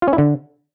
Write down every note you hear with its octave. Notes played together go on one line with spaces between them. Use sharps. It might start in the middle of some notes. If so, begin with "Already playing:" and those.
F4
C#4
E4
D3